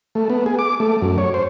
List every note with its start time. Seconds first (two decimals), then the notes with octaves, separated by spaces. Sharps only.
0.15 A3
0.30 B3
0.46 G#4
0.59 D6
0.80 A3
1.02 F#2
1.18 C#5
1.34 C5